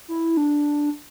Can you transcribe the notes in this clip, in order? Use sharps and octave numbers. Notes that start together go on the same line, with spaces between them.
E4
D4